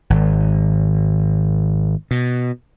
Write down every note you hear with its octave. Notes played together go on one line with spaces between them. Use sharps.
G#1
B2